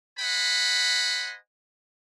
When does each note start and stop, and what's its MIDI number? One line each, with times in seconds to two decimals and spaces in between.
0.19 1.36 72
0.19 1.36 75
0.19 1.36 78
0.19 1.36 80
0.19 1.36 83